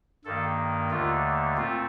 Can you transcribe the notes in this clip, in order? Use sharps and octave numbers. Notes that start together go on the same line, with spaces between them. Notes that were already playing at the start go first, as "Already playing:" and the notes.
G2 D#3 A#3 A4
D#2 D3 A3 F4
A#2 A3 C4 F4